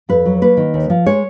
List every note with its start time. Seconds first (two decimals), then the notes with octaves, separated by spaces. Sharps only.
0.09 F2 B4
0.26 F#3
0.41 A#3 B4
0.57 D#3
0.74 D#2
0.90 F3
1.06 G#3 C#5